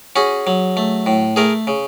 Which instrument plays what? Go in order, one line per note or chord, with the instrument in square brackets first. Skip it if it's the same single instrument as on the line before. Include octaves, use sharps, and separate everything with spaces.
[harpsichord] C#4 F#4 G#4
F#3
A3
A2
A3 G#4 A#4
C#3